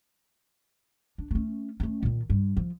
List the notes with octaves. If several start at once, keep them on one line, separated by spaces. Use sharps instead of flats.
D4
A3 C#4
A3 C#4
A#2 D#3
G2
F3